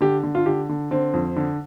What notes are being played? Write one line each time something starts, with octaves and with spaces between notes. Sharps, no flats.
D3 G4
D3
F4
D3 G4
D3
D3 C4
F2
D3